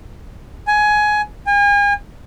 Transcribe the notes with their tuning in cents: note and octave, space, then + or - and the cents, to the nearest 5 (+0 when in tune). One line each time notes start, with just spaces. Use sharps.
G#5 +15
G#5 -40